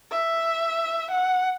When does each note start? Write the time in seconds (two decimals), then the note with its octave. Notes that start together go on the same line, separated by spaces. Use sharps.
0.11 E5
1.11 F#5